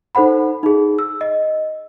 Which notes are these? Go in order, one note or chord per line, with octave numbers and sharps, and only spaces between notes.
D#4 A4 C5 F#5 B5
D#4 G#4
E6
D#5